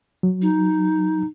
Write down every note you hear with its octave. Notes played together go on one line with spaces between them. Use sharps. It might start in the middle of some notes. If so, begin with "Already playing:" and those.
F#3
D#4